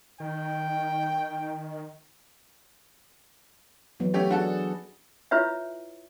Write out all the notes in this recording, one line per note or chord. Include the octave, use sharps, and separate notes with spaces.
D#3 G5
E3 F#3 B3
A3 C#4 G4
D4 F#4 G#4 A4
E4 F4 B4 C#5 E5